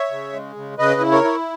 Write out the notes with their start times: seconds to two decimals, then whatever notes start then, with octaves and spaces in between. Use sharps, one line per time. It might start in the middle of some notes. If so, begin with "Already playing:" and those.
Already playing: C#5 E5
0.11 C#3
0.33 G#3
0.56 C#3
0.78 C#3 B4 D#5
1.01 E4
1.12 A#4 C#5
1.24 E4